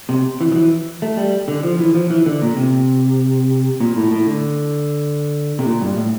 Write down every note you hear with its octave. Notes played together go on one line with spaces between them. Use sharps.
C3
E3
F3
E3
A3
G3
D3
F3
E3
F3
E3
D3
A#2
C3
A#2
A2
A2
D3
C3
A#2
G2
A2